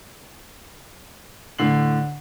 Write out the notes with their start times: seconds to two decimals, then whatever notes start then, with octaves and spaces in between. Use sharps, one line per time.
1.59 A2 D3 C7 F#7